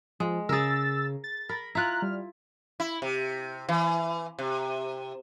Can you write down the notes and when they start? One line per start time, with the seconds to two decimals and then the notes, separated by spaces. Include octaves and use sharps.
0.20 F3 G#3
0.49 C#3 G#4 A#4 E6 A6
1.24 A6
1.49 A#4 B5
1.75 E4 F4 A#5 F6 F#6
2.02 G3
2.80 E4
3.02 C3
3.69 E3
4.39 C3